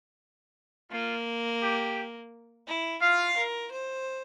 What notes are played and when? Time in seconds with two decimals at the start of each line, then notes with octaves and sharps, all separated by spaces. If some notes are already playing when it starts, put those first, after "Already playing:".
0.91 A#3 F4
1.62 G4
2.67 E4
3.02 F4 F5
3.37 A#4
3.71 C5